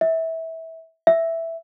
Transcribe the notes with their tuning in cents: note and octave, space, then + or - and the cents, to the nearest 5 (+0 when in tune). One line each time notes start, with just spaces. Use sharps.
E5 -20
E5 +0